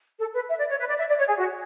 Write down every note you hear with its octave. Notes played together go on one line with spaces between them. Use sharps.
A4
B4
E5
D5
C#5
B4
D5
E5
D5
C#5
G#4
F#4